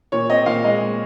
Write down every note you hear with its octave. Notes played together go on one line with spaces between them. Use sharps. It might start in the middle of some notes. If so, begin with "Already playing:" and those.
A#2 C#5
C4 D#5
A#2 F5
G#3 D#5
G#3